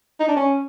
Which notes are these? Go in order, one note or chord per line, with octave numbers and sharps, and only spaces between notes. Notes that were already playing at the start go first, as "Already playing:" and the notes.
D#4
D4
C#4